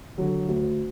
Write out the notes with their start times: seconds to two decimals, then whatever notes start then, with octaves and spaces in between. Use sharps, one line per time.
0.18 D3 F#3
0.48 D2